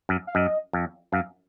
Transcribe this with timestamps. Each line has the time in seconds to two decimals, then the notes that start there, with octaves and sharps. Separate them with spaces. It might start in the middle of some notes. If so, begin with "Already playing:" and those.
0.09 F#2
0.27 F5
0.35 F#2 D#5
0.73 F2
1.12 F#2 F5